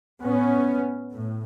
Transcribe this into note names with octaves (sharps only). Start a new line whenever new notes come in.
A2 B3 C#4
A2